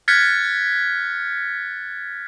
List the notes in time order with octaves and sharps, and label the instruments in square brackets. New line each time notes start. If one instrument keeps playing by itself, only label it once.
[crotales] F6 F#6 G#6 A6 B6 C#7